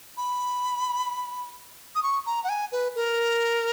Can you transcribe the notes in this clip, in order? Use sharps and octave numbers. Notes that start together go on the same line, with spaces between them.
B5
D#6
C#6
A#5
F#5
G#5
B4
A#4